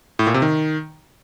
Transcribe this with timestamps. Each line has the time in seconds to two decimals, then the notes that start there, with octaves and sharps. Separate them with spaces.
0.19 A2
0.27 A#2
0.34 C3
0.42 D#3